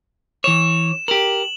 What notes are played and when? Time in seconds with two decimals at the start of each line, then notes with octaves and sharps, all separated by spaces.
0.44 E3 C#5 E7
1.08 G4 A#4 F#7